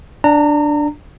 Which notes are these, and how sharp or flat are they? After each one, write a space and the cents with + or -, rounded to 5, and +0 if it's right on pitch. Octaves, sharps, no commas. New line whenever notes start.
D4 +0 A#5 -30